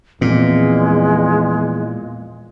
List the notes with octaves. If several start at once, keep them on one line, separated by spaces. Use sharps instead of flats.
E2 A#2 F3 G#3 C4